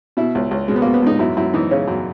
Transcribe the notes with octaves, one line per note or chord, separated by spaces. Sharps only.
B2 E4
C#2
C#2
B2 G#3
B3
B2 A#3
B3
C#2 D#4
F#2 E4
F#2 E4
E3 D#4
C#3 C#4
F#2